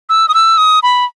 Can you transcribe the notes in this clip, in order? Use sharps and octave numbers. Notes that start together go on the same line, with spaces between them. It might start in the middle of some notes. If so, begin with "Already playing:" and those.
E6
D#6
E6
D#6
B5